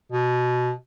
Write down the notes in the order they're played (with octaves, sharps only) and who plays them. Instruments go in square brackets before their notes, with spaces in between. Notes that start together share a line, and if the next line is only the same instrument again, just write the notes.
[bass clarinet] B2